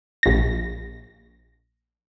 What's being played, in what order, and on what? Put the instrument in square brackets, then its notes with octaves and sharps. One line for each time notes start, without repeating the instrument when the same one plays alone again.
[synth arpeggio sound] A#1 A#6